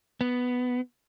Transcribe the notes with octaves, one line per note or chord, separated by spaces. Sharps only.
B3